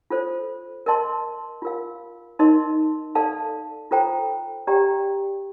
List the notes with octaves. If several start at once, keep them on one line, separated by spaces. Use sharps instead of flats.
F4 A4 C5
A#4 D#5 A5 C6
F4 A#4 F5
D#4 A#4 D#5 A5 C6
A4 D5 F5 A5
F4 A4 C5 G5 A#5
G4 D5 G5 A#5